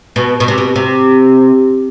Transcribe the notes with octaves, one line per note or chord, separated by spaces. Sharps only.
B2
B2
C3
B2
C3